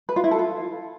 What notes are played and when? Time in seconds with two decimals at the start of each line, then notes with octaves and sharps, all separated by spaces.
0.09 B4
0.16 F4
0.24 E4
0.31 A4
0.39 F4